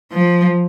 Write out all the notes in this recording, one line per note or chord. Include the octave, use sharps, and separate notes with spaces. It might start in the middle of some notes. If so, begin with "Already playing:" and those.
F3